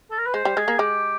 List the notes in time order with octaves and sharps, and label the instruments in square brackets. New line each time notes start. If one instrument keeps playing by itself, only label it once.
[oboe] A4
A#4
B4
[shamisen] G#3 [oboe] C5
[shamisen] G3
[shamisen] G#3 [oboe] G#4
[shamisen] A#3
[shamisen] G#3 [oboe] G4